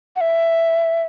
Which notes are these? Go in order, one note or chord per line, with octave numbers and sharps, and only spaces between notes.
F#5
E5